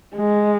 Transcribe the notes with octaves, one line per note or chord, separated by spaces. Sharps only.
G#3